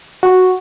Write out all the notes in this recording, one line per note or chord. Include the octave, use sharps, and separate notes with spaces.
F#4